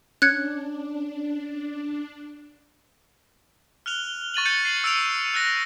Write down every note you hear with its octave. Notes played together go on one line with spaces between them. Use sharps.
C#4 D4 F#6 G#6 C#7
F6 F#6 F7 G7
C#6 A6 D#7 F#7
G6 A6 C#7
C7 F#7
E6 A6 C#7 D7 F7 F#7
E6 F#6 A6 A#6